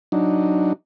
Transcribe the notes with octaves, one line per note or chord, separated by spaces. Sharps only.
F#3 D4 D#4